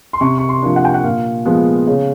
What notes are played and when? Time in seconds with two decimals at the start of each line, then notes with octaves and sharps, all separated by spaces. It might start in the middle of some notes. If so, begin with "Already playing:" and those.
0.13 C6
0.21 C3 C#6
0.38 C#6
0.49 C6
0.62 F3 A#3 D4
0.76 F#5
0.85 G5
0.94 F#5
1.04 A#2 F5
1.45 F3 G#3 B3
1.87 C#3